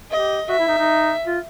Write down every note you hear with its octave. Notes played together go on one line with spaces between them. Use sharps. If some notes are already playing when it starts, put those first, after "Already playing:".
G4 D#5
F#4 E5
E4
D#4
D#4
F4